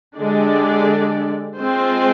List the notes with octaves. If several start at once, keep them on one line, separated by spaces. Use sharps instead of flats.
D3 G#3 D4 G4 D5
G#3 C4 F4 C5